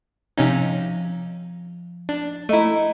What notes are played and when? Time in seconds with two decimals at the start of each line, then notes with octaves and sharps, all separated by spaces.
0.37 C3 F3 C#4 D#4
2.09 D4
2.49 A3 E4 D#5 A#5